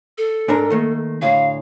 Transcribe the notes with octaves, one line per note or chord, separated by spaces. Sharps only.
A4
G#2 D4 A#4
D#3 A3 A#3
D2 A2 F5